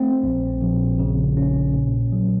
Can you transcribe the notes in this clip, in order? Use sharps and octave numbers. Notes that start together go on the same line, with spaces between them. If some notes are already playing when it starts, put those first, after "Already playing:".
Already playing: A3 C4
A#1
A#1
C#3
C#4
A#2
F#3